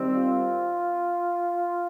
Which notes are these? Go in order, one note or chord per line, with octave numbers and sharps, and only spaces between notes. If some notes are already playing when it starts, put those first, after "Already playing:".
Already playing: D#3 G3 C4
F4